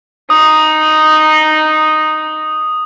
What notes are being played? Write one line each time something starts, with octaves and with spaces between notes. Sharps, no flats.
D#4 D#6